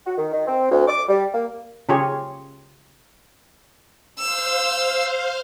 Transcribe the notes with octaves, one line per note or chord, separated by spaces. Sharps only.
F#4
D#3
D#3
C4
D2
D6
G3
A#3
C#3 F4 G4 G#4 C#5
C5 F5 E6